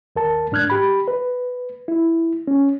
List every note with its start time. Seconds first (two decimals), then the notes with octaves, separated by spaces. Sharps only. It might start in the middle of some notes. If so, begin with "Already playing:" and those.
0.16 D#2 A#4 A5
0.52 G#2 D4 F6 F#6 G#6
0.70 G4 B5
1.08 B4
1.88 E4
2.48 C#4